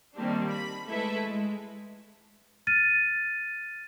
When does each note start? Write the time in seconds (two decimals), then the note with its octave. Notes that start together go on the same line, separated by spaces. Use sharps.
0.16 D#3 G3 A#3 C4 D4
0.51 B5
0.86 G#3 A3 E4 A4 B4 E5
1.24 G#3
2.67 F6 A6 D#7